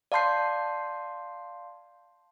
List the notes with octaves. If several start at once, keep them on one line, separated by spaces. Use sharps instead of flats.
D5 F5 A5 C6 G6 C7